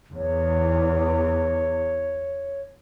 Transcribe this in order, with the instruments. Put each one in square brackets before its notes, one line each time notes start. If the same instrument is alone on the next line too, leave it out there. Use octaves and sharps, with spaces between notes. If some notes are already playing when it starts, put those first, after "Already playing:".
[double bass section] E2 [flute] C#5